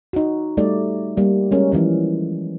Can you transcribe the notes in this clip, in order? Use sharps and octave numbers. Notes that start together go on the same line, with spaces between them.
D#4 F#4
G3 A3 D#4 D5
G3 A#3
G3 G#3 C#4 A#4
E3 F3 C#4